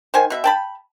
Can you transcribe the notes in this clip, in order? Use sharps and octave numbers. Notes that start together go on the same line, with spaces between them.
D#3 C5 G#5
B2 E5
G5 A5 B5